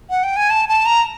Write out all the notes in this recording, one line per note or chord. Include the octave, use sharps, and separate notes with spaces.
F#5
G5
G#5
A5
A5
A#5